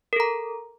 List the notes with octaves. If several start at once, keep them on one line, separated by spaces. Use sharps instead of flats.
A4 A#4 A#5